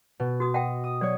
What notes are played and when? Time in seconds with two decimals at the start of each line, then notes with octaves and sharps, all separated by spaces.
0.20 B2
0.40 F#4 D#6
0.54 D#5 F#5 G5
0.84 D#6
1.01 F#3 C#5 D5